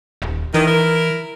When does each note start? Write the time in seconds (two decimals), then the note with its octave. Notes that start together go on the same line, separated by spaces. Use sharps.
0.22 D#1
0.54 D#3 E3
0.67 E4 A#4